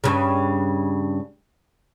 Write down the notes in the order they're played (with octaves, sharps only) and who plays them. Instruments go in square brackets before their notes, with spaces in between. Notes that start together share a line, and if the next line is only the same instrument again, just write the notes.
[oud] G2 C#3